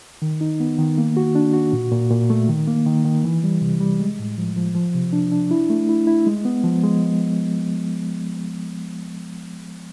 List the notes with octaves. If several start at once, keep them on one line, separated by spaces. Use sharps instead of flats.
D#3
D#4
B3
D#3
A#3
F#4
D4
F#4
A#2
A#2
A#2
A3
D#3
A#3
D#3
D#3
E3
G3
C3
G3
G#3
A2
F3
F3
F3
C3
D4
D4
E4
A3
E4
E4
G#3
B3
F3
G#3